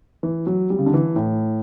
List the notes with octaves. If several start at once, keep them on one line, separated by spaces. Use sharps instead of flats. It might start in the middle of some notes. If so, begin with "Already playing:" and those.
E3
F#3
G3
C#3
D3
E3
A2